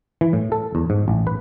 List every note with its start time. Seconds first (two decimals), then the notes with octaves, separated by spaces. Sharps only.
0.21 E3
0.33 A2
0.52 A4
0.75 E2
0.90 G#2
1.08 A1
1.27 B4